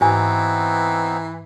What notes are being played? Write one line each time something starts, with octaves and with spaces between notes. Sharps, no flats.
G#2 E3 B3 C4 D#4 G#5